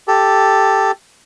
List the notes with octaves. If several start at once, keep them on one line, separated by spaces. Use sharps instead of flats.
G4 A4